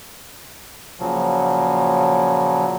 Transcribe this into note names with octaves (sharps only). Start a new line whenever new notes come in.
A#2 C#3 F3 F#3